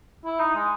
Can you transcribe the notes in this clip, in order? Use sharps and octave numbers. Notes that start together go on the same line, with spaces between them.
E4
D#4
G#3